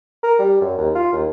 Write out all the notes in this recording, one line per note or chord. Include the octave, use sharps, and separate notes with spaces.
A#4
G3
F#2
D#2
F4
D#2